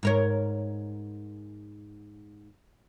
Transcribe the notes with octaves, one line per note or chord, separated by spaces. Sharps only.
G#2 A#4 C#5